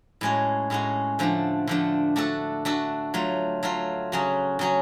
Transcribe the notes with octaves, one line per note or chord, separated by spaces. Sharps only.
A2 G#3 C#4 F#4
A2 G#3 C#4 F#4
D3 F3 A3 D4
D3 F3 A3 D4
A3 D4 F#4 A4
A3 D4 F#4 A4
F#3 A3 F4
F#3 A3 F4
C#3 F#3 C#4 F#4
C#3 F#3 C#4 F#4